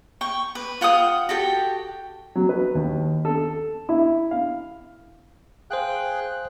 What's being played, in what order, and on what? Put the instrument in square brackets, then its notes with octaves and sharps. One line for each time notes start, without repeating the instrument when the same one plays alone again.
[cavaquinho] G5 C#6
B4 D6
F4 F#5 G5 D#6
F#4 G4 A4 G5
[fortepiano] F#3
B4
D#2
A4
E4
F5
[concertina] G#4 G5 F#6 [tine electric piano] C5 F5